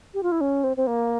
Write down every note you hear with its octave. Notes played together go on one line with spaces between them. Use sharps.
G4
F4
E4
C#4
C4
C4
A#3